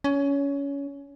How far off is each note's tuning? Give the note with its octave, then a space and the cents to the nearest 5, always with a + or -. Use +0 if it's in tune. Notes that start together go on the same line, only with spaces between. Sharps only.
C#4 +20